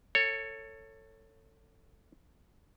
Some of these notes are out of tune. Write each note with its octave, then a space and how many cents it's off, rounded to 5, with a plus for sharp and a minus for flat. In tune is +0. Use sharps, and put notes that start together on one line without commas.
A4 +25 C#5 +0